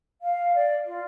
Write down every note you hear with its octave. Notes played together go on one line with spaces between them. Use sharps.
F5
D5
F4